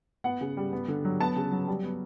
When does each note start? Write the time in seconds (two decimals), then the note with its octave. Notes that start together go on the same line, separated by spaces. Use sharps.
0.24 B3 F#5
0.41 C#3
0.57 G3
0.73 B3
0.88 D3
1.05 F#3
1.20 B3 A5
1.36 C#3
1.52 F#3
1.68 G3
1.83 B3